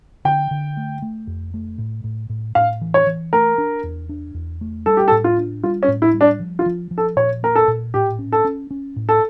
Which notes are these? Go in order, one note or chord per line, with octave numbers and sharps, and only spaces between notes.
D3 G5
D3
A3
A3
F2
A3
A2
A2
A2
A2 F5
E3
C#5
E3
A3 A#4
D4
E2
D4
E2
A3
G3 A4
G4
A4
A2
F4
D4
G3 F4
C#4
A2
E4
G3
D4
F3
F4
F3
F3
A4
A#2 C#5
A#3 A#4
A4
A#2
A2 G4
C#4
A4
C#4
C#4
A2
A4